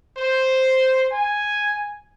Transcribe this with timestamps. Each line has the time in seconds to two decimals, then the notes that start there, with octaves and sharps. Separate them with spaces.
0.17 C5
1.11 G#5